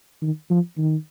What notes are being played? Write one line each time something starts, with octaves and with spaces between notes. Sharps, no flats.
D#3
F3
D#3